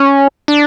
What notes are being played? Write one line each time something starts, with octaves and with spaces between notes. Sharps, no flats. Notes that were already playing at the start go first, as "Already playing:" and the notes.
Already playing: C#4
D4